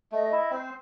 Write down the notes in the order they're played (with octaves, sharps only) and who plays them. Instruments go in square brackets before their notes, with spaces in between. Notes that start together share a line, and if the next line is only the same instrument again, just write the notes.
[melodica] A3 [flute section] D#5
[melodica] E4
[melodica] C4 [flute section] C5